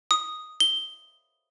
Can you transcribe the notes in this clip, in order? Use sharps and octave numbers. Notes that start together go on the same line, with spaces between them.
D#6
G7